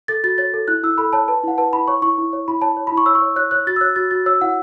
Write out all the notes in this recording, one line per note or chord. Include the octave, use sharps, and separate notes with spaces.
A4 A6
F#4 A6
C#5 A6
A4
E4 F#6
E4 E6
A4 B5
C#5 A5
B4 A5
E4 F#5
B4 A5
E4 B5
C#5 C#6
E4 C#6
E4
C#5
E4 B5
C#5 A5
C#5
B5
E4
C#6
C#5 E6
C#6
C#5
C#5 F#6
C#5 F#6
F#4 A6
E6
C#5 F#6
F#4 A6
F#4 A6
C#5 E6
E4 F#5